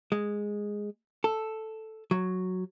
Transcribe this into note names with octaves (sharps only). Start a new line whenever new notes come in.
G#3
A4
F#3